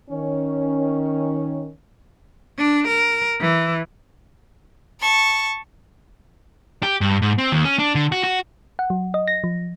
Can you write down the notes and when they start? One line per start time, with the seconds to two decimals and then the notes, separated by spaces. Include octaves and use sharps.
0.10 D#3 C#4
2.58 D4
2.87 A#4
3.41 E3
5.01 A5 C#6
6.83 G4
7.01 G2
7.22 G#2
7.38 C4
7.52 D#2
7.65 C#4
7.79 D4
7.95 D3
8.12 F#4
8.24 F#4
8.79 F#5
8.90 F#3
9.14 D#5
9.28 A#6
9.44 F3